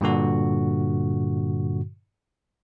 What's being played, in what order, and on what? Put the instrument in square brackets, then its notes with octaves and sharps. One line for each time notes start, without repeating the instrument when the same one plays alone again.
[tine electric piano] G2 A#2 D3 F#4